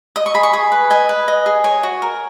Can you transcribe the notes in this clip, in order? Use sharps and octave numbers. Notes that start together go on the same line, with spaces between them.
D#5 D#6
C#6
G#4 B5
C#6
G#4 B5
B4
D#5 G#5
B4
D#5
G#4
C#5 G#5
F#4
A#4